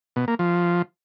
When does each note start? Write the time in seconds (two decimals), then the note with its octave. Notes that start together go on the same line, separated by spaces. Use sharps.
0.16 B2
0.28 A#3
0.39 F3